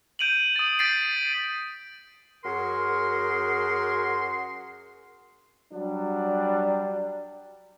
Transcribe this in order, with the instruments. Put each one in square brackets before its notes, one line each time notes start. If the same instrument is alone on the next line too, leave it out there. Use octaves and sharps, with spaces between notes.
[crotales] G6 D7 D#7 F7 F#7
D#6 A6
G6 A6 B6 C7 D7
[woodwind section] F#2 F#4 G#4 A#4 C6
[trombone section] F#3 G3 D4